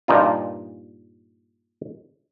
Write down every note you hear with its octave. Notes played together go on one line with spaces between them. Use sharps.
G2 A#2 D#4 F4